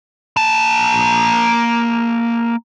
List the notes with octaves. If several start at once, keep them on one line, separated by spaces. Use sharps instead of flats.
A#3 A5